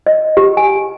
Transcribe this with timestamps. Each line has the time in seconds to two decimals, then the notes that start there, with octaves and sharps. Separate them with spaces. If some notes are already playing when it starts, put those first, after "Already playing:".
0.07 D#5
0.37 G4
0.57 G#5